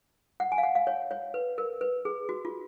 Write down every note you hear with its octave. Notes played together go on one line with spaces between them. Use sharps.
F#5
G#5
F5
F#5
F5
C#5
C#5
B4
A#4
B4
G#4
F#4
F4